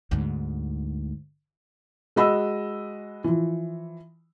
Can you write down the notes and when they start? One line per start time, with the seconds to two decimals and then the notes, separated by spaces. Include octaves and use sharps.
0.11 D2 G#2
2.16 G#3 F#4 D#5 B5 E6
3.24 E3 F3